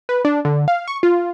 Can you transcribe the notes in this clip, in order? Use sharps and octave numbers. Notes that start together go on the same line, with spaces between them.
B4
D4
D3
F5
C#6
F4